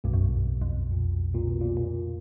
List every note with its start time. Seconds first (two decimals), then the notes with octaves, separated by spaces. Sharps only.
0.04 B1 G2 B2
0.13 F#2
0.23 G2
0.34 F2
0.62 F2
0.92 A#2
1.35 A#2
1.48 B2
1.61 A#2
1.77 A#2